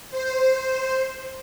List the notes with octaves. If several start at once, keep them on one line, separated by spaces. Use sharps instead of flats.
C5